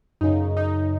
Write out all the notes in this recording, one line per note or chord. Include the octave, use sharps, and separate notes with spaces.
F#2 C#3 D#4
D#4